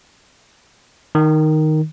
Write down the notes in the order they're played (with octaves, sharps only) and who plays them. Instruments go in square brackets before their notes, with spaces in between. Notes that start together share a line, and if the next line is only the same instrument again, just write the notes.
[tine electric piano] D#3